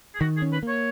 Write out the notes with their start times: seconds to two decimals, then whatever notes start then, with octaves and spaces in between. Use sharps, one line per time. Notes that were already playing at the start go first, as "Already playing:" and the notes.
0.15 G#4
0.20 D#3 F#4
0.37 G#4
0.42 C#4
0.52 B4
0.63 A#3
0.68 C#5